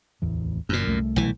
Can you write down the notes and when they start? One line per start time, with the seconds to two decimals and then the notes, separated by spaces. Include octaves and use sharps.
0.22 D1 A1 E2
0.69 F#1 F#2 A#2
0.87 C2 A3
1.16 B1 E3